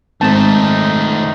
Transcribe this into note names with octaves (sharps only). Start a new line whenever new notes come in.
G#2 D#3 A3 C4 D#4 A5